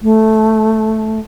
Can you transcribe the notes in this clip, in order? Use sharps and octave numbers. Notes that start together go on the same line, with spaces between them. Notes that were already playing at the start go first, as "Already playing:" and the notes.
A3